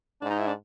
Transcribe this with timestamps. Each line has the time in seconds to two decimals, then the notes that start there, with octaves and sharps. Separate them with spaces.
0.21 G#2 D4
0.30 D#4
0.39 E4
0.47 D4